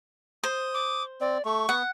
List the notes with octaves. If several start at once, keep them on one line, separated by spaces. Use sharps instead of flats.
C5 D#6
D6
C4 D5
A3 C#6
B3 F#5